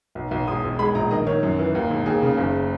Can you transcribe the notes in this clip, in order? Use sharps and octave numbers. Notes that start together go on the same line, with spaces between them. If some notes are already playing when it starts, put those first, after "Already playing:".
B1
B1
E1 D#6
E1
G#3 B5
A#1 A#5
D#3 D#5
D#3 C#5
F#2
E3
D#2
E1
D#2 G#4
C#3
F#1